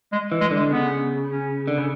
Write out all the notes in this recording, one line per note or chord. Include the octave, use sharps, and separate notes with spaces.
G#3
E3
G#3
D3
G#3
C#3 B3
C#4
D3
C#3